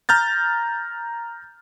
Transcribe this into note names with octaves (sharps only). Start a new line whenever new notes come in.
A#5 F6 G6 A6